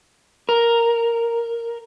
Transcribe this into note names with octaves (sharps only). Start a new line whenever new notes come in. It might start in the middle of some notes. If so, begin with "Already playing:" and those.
A#4